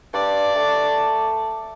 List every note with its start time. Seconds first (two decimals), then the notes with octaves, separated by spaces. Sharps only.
0.14 G2 D5
0.55 A3